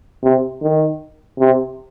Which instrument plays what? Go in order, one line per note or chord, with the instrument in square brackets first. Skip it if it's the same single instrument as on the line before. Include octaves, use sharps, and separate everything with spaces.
[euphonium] C3
D#3
C3